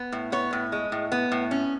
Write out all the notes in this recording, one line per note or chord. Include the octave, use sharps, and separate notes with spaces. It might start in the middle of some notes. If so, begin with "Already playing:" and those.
Already playing: B3
A2
B3 C#5
A2
G#3
A2
B3
A2
C#4